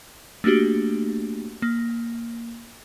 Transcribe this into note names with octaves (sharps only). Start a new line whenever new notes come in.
A3 A#3 D4 F#4 G4
A#3